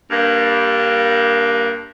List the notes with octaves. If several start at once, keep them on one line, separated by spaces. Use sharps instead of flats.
G2 A#3